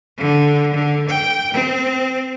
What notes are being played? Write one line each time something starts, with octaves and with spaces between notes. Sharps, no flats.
D3
D3
G5
C4